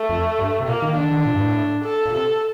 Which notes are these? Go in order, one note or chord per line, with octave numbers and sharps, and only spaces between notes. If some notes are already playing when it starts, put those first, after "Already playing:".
Already playing: A3
F2
G2
C3
A#2 A#3
D#3
D#3 D4
D#3
A#2
G2
A2
A4
A#2
C3 A4